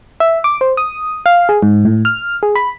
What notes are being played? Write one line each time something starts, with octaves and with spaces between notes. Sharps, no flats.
E5
D6
C5
D#6
F5
G#4
G#2
A2
F6
G#4
B5